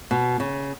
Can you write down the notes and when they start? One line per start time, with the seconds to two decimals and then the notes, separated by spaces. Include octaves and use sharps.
0.11 B2
0.40 C#3